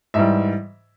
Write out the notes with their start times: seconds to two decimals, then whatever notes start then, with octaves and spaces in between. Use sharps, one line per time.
0.14 G#2 E3 G3 E5